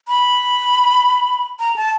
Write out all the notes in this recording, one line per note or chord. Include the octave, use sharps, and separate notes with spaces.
B5
A#5
A5